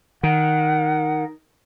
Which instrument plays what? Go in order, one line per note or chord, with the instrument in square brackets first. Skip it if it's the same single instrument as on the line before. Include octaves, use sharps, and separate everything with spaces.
[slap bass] D#3 [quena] F#5